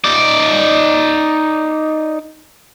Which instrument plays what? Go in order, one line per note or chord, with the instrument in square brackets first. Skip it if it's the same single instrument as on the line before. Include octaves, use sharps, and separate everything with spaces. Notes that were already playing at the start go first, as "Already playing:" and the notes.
[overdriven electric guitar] D#4 D5